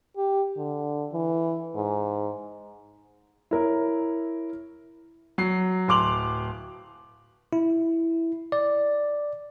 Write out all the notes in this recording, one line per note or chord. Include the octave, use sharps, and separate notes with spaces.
G4
D3
E3
G#2
E4 A#4 C#5
F#3 C7
D1 C6 D6 F7 F#7
E4
D5